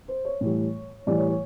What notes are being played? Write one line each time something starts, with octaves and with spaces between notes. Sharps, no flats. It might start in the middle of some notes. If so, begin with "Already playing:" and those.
C5
C#5
A2 E3 G3
A2 E3 G3 D5
C#5
C#5